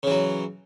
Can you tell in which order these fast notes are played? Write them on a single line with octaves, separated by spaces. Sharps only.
C#3 E3 F#3